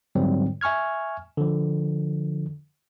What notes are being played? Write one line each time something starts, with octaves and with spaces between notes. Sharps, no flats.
G#2 D3 F#3 G3 C4
E5 G#5 C#6 F6 G#6
D3 F3